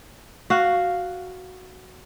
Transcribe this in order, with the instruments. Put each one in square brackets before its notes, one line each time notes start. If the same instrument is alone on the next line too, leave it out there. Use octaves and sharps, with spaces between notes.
[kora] F#4 F5